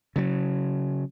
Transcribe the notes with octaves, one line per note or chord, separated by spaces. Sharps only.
C#3 F#3